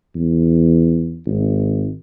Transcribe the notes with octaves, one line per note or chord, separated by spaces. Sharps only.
E2
G#1